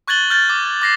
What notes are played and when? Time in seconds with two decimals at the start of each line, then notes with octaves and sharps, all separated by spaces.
0.08 C#6 F#6 G#6 A6 F#7 G7
0.30 F6 G6 A6
0.50 D6
0.82 D6 A#6 C7